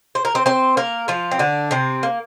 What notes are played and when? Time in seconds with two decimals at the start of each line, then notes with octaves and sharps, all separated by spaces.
0.15 C5
0.25 A#4
0.35 C4 C5
0.46 C4 C5
0.77 A#3 A#4
1.08 F3 F4
1.31 C4
1.39 D3 D4
1.71 C3 C4
2.03 A#3